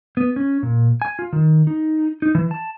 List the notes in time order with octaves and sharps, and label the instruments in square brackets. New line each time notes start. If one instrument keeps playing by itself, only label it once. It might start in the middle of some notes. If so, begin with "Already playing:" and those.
[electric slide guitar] B3
C#4
A#2
G#5
F4
D#3
D#4
D#4
E3
A5